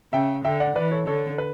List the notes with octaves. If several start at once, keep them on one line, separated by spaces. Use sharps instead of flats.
C#3 E5 G5
D3 E5 G5
D5 F#5
E3 B4 D5
A4 C#5
D3 A4 C#5
B4